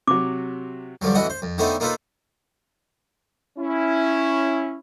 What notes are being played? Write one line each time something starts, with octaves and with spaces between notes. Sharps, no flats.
C3 F#3 D6
G2 D3 F3 F#3
A1 E3 E4 F#4 D#5 F#5
C5
F2
D3 A3 B3 C4 D4 D#4
A#3 D#4 F4 A4 B4 C5
C#4 E4